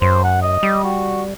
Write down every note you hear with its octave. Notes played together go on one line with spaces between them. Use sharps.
F#2 C5
F#5
D#5
G3
F#4